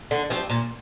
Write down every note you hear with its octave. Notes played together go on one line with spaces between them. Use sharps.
D3
F3 C4 G4
A#2